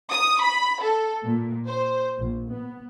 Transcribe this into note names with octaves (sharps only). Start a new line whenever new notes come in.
D#6
B5
A4
A#2
C5
A#1
B3